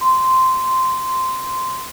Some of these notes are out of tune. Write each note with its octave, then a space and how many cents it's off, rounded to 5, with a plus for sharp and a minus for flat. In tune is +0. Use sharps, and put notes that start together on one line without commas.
C6 -10